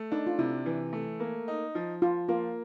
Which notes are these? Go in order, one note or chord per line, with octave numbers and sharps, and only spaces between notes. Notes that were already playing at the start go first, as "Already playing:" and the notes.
Already playing: A3
D4 D#4
F4
C3 E4
E3
A3
A#3
D#4
F3
F3 F4
A#3 F4